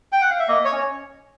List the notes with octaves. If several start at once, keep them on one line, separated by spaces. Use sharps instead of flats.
G5
F#5
F5
E5
A#3 D#5
C#5
C#4